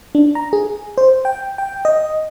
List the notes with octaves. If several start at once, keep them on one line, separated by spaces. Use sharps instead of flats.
D4
A#5
G#4
C5
G5
G5
D#5